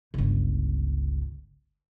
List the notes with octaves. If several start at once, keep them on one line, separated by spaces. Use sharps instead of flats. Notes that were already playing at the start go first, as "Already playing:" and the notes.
G1 C#2